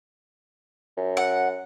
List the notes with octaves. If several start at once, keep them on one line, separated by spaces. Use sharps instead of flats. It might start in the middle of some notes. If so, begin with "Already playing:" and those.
F#2
F#5